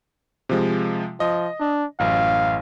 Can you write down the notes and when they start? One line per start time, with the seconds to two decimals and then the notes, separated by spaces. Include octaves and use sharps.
0.49 C3 F3 G#3
1.20 F3 D#5
1.60 D4
1.99 A1 F#2 F5